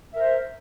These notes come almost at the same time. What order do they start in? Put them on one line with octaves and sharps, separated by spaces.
E5 A#4 C5